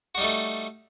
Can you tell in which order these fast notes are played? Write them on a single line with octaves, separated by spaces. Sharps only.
F#4 G3 D#4 A3